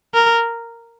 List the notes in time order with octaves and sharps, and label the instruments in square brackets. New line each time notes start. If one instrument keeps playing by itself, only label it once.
[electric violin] A#4